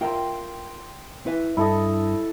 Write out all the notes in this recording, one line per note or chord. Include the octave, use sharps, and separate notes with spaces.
F4 A#4 E5 G5 C6
E4 B4 E5
G2 E4 A4 D#5